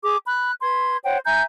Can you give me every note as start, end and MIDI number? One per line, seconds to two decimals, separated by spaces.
0.03 0.17 68
0.03 0.17 86
0.25 0.52 83
0.25 0.52 90
0.61 0.97 71
0.61 0.97 84
0.61 0.97 92
1.03 1.18 72
1.03 1.18 73
1.03 1.18 78
1.03 1.18 79
1.25 1.42 76
1.25 1.42 80
1.25 1.42 82
1.25 1.42 91